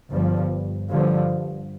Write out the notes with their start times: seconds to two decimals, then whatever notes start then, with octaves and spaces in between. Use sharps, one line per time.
0.10 G1 G2 F3
0.90 G2 D3 F3